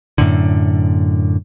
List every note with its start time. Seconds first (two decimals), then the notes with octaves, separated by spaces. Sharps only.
0.18 F#2 A2 D3